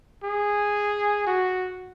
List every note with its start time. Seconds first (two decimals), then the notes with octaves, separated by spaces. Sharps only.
0.24 G#4
1.27 F#4